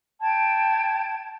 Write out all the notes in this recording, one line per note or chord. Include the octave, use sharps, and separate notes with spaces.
G5 A5 G#6